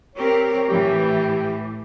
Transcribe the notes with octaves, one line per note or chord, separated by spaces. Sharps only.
C4 G4 A#4 C#5
A2 E3 G4